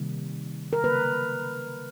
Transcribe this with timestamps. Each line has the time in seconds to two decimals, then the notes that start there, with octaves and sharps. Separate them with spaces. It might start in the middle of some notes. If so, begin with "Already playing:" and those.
Already playing: C3 D#3 G3 A#3
0.73 A#4
0.84 C#3 F#3 A#3 B4